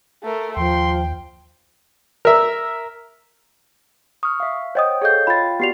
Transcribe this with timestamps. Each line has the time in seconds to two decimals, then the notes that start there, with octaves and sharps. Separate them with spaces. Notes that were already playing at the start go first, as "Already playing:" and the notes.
0.23 A3 A#4
0.57 D#2 F3 G5 C6
2.25 A#4 E5
4.23 C#6 D#6 F6
4.40 E5 F5
4.75 C5 C#5 D#5 F#5 G5 D#6
5.02 G#4 A4 C#5 D#5 F5 G6
5.27 F4 F5 G5 B5 A6
5.60 B3 F#4 G4 D5 C7 F7